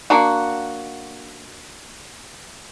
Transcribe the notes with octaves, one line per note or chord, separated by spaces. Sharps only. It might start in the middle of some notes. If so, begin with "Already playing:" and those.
A#3 D4 F#4